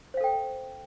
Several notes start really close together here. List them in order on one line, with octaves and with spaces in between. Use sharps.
C5 F5 A4 G5